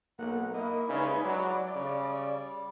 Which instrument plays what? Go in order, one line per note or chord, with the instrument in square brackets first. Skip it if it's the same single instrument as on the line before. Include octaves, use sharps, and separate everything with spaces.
[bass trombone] B1 [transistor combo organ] A#3 [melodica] F#5
[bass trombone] A#3 [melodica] E4 [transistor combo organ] D#5
[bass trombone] C#3 [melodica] G3 G#3 E4 [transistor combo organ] D#4 B4 G#5
[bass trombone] F#3 [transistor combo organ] D5
[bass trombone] C#3 [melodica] G3